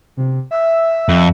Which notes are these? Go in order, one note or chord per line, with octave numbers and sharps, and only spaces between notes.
C3
E5
F2